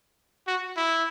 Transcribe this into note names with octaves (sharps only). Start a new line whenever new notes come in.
F#4
E4